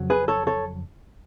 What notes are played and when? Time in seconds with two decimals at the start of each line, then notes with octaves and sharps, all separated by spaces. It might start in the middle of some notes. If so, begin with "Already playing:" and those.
Already playing: F2 C#3 F#3
0.10 G#4 B4
0.28 A4 C#5
0.47 A4 C#5